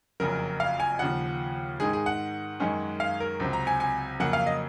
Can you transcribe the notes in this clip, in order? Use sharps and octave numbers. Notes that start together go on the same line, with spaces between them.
F#1 F2 C#3 F#3 A#4
F5
G#5
D#2 C#3 F3 F#5
G#2 D#3 G#3 G#4
G#4
F#5
F#2 D#3 G#3 C#4
F5
A#4
C#2 C3 F#3 C4
A#5
G#5
G#5
F2 C#3 F#3 A#3 F#5
F5
D#5